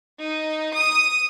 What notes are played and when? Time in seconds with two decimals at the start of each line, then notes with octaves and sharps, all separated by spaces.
0.19 D#4
0.74 D#6